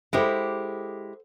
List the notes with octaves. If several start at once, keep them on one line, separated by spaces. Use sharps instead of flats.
G#3 E4 G4 A4 C5 F#5